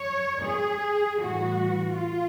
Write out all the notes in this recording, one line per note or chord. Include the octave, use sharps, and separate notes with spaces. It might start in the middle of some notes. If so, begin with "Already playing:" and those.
Already playing: C#5
G#4
A2 E3 G3 F#4
F4